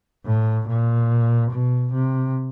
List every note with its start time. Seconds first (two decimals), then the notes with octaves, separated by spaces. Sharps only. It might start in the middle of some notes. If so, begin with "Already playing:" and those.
0.26 A2
0.68 A#2
1.51 B2
1.93 C3